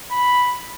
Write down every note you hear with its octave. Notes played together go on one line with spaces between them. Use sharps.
B5